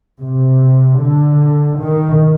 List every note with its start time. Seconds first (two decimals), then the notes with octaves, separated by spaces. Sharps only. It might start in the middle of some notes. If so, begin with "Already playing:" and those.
0.21 C3
1.00 D3
1.80 D#3